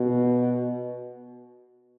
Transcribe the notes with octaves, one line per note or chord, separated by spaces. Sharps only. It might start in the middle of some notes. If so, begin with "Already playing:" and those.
Already playing: B2